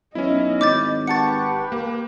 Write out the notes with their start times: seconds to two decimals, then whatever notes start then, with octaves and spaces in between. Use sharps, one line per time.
0.15 B1 C#4 E4 D#5
0.61 G#1 D6 G6 A6
1.07 G4 B4 F#5 A5 C#6 A6 C#7
1.72 A#3